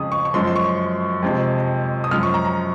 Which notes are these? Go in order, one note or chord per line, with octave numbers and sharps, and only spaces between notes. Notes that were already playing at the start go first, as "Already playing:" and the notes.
Already playing: F2 C#3 G#3 D#6
C#6
C#6
F#2 F3 G#3 C6
C6
C#6
F2 C3 F3 G#3
D#6
F#2 F3 G#3 F6
C#6
A#5
A#5